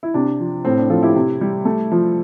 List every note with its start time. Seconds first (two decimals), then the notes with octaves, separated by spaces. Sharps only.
0.03 E4
0.14 C3 D4
0.40 F3
0.65 A2 C4
0.78 D4
0.90 F3 F4 A4
1.03 E4 G4
1.15 C3
1.41 G3
1.65 A3
1.92 F3